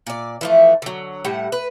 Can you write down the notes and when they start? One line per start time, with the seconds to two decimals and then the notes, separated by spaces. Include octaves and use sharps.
0.07 A#2 D5
0.41 E3 F3 A3
0.82 D3 F#3
1.25 A2 G3 F#5
1.52 B4